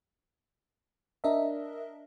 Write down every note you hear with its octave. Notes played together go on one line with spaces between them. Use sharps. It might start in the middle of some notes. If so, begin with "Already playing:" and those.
D4 A#4 D#5 E5